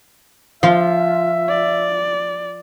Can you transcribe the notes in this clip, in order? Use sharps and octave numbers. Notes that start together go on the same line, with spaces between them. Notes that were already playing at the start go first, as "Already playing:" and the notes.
F3 F4 E5 F5
D5